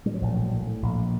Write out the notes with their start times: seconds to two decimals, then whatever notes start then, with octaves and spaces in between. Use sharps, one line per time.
0.06 A2 G3
0.14 F#3
0.22 A#1 F3
0.31 F#3
0.36 A2
0.52 A2
0.67 A2
0.83 A#1